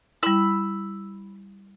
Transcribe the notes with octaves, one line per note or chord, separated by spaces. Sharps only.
G3 E4 B5 E6